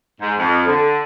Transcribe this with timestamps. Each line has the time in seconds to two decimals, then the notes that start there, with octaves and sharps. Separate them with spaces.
0.21 G#2
0.38 F2
0.66 D3